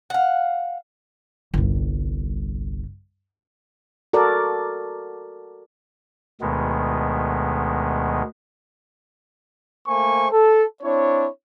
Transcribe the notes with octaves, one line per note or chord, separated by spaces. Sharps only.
F5 F#5
G1 C2
F#4 A4 A#4 D5
D2 B2 D#3 G#3 B3
A3 A#3 C5 G#5 C#6
A4
C4 D4 E4 C#5